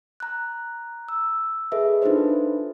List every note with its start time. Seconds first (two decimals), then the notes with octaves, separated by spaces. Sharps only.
0.20 A#5 F#6
1.09 E6
1.72 G#4 A4 B4 D#5 E5
2.02 D4 D#4 F4 A4 B4 C5